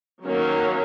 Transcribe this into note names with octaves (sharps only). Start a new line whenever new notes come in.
D#3 F#3 A#3 C#4